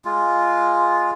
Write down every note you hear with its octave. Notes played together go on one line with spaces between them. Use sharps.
G#3 F4